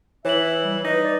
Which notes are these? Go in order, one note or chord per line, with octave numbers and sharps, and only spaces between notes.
E3 C#5 E5 F#7
G3
D#4 B4 A#6
D5